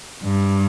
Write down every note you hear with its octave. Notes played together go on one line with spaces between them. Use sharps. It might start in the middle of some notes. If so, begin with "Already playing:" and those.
G2